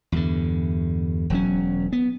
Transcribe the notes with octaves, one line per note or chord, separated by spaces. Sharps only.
E2 G2 D3
E1 F#3 C#4
B3